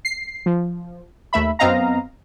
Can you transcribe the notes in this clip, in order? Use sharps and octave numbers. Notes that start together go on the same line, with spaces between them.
C7
F3
D#2 A3 E5 B5
F#2 B3 C4 D#5 F5 A#5